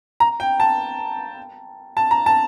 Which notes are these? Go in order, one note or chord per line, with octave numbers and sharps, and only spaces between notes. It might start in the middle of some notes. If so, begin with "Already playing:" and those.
A#5
G5
A5
A5
A#5
A5